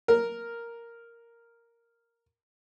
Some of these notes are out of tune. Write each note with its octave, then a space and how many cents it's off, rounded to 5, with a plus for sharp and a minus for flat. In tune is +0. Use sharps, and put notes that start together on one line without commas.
A#4 +0